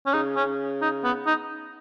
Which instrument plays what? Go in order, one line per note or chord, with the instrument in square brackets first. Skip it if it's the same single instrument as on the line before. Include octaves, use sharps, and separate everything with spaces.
[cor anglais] C#4
[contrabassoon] C#3 [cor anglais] D#4
[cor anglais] C#4
D#4
B3
D#4